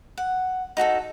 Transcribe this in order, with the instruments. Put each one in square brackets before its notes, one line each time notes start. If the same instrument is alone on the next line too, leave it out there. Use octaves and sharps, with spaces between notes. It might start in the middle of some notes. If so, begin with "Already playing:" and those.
[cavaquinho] F#5
D#4 F#4 G#4 A4